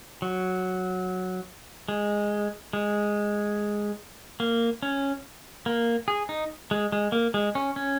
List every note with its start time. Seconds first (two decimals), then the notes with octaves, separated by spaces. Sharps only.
0.22 F#3
1.88 G#3
2.73 G#3
4.40 A#3
4.83 C#4
5.66 A#3
6.08 G#4
6.29 D#4
6.71 G#3
6.92 G#3
7.12 A#3
7.34 G#3
7.55 C#4
7.76 C#4